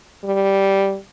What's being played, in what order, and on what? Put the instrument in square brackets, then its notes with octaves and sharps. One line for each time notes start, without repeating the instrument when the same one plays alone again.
[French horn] G3